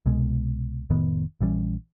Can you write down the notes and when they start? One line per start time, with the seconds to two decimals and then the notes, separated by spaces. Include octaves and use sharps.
0.06 C2 B2 G#3
0.90 F1 A2 D#3 B3
1.41 A#1 E3 G3 C#4